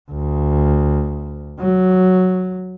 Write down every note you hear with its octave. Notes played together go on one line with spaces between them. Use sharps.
D2
F#3